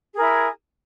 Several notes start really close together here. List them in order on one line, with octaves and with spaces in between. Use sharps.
G#4 A#4 E4